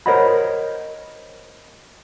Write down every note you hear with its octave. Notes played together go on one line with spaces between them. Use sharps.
A#4 C5 C#5 D#5 F#5 B5